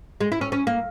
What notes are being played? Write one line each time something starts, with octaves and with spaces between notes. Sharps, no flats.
G#3
E4
C#4
C#4
A#3